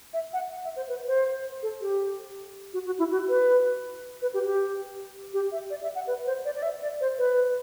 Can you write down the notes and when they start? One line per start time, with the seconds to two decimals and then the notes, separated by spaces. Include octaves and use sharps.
0.14 E5
0.33 F#5
0.51 F#5
0.64 E5
0.76 C5
0.89 B4
1.07 C5
1.63 A4
1.82 G4
2.73 F#4
2.86 F#4
2.99 E4
3.11 F#4
3.29 B4
4.22 B4
4.34 G4
4.46 G4
5.33 G4
5.52 E5
5.70 D5
5.83 E5
5.95 F#5
6.07 B4
6.26 C5
6.45 D5
6.56 D5
6.63 E5
6.82 D5
7.01 C5
7.18 B4